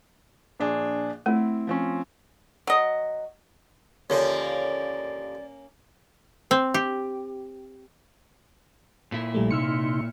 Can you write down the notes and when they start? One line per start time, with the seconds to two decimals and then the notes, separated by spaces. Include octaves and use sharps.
0.59 A#1 D4 G#4
1.26 A3 C4 E4
1.67 F3 C4 C#4
2.67 F#3 D#5
4.10 D#2 D3 F3 A#3 C#4 C#5 D5
6.51 C4
6.74 G4
9.12 A#2 E4
9.34 A#1 G3 A3
9.51 C3 D#4 C6 E6 F6 C#7